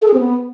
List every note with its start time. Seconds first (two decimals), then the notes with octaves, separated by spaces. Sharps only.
0.02 A4
0.08 G#4
0.14 C4
0.20 B3